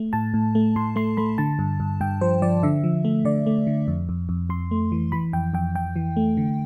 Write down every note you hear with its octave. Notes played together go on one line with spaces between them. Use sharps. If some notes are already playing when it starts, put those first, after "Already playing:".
Already playing: A3
A2 A5
A2
A3
A2 C6
A3 C6
A3 B5
D3 A5
G2
G2
G2 G5
F3 C5
F3 D5
D3 E5
F3
A3
D3 D5
A3
D3
F2
F2
F2
F2 C6
A3
E3
E3 B5
F2 G5
F2 G5
F2 G5
E3
A3
D3